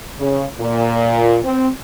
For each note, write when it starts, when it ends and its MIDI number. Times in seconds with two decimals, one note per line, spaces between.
0.20 0.45 49
0.60 1.38 46
1.44 1.68 60